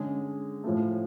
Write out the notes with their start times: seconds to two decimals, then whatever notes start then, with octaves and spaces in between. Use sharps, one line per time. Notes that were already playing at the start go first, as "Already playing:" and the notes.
Already playing: D3 G#3 C#4 G#4
0.64 A2 F3 A3